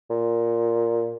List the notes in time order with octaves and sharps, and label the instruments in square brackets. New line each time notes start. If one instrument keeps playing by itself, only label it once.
[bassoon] A#2